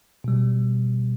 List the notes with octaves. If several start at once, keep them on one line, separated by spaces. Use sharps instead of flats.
B2 G3